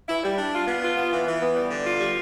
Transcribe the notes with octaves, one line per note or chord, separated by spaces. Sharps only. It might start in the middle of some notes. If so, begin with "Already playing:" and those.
E4
G3
D4
F4
B3
F4
B3
E3
E3
B3
G3
D3
F4
G3